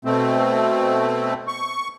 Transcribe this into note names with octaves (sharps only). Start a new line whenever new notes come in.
B2 A3 C4
C#6